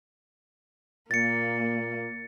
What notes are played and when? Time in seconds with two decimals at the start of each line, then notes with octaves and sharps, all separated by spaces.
1.11 A#2 A#3 A6 C#7